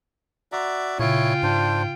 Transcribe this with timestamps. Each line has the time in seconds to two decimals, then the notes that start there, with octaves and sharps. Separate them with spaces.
0.52 F#4 D5 E5 A#5 C6
0.99 A#2 C#3 E4 F4 G#4 C#5 G5
1.43 G#2 D4 C5